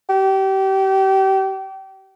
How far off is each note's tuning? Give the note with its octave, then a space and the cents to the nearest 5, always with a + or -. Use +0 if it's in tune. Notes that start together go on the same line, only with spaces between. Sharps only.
G4 -30